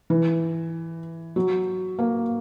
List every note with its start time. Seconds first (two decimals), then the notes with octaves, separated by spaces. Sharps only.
0.10 E3
1.36 F#3
1.99 A#3